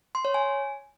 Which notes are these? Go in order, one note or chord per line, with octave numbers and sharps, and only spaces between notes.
C6
C#5
G#5